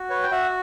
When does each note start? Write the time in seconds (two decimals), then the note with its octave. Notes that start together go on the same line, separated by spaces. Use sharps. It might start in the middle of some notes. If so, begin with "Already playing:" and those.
Already playing: F#4
0.10 B4 C#5
0.23 G5
0.31 F#4 E5 F#5